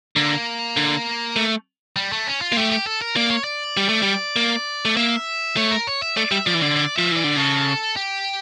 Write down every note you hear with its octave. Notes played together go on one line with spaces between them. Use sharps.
D3 A#3
D3
A3
G3
A3
C#4
F4
A#3
A3 G4
G4
A4
A#4
A#3 D5
C#5
D5
G3
A3
G3
A#3
A3
A#3 E5
A3 C#5
A#4
C#5
E5
A3 D5
G3 E5
F3 D5
E3
D3 D5
D5
F3 E5
E3 D5
D3
C#3 A4
G4